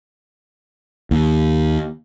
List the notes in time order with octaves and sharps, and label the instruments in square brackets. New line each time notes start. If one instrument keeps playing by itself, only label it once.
[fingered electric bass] D#2